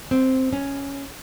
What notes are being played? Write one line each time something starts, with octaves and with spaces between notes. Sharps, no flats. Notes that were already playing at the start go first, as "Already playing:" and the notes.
C4
C#4